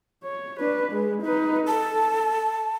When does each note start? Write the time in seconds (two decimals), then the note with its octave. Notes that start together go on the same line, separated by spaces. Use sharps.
0.24 C#5
0.60 D4 B4
0.92 G#3
1.22 D#4 B4
1.67 A4 A5